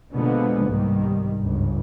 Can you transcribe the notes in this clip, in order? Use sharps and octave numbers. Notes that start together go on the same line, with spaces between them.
B2 D3 F3 G#3 A#3 B3
C2 G#2 D#3 G3
G1 C#2 G2